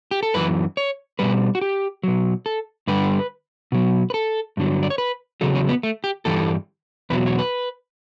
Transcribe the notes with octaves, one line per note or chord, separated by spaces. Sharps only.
G4
A4
F#2 E3 B4
C#5
B2 G3 B4
F#4
G4
B2 F#3
A4
G2 D3 G3 B4
B2 F#3
B4
A4
G2 D3 F#3
D5
C#5
B4
E2 C#3 F#3 A4
C#4
B3
A3
G4
G2 E3 G3 A4
E2 B2 F#3 B4
C#5
B4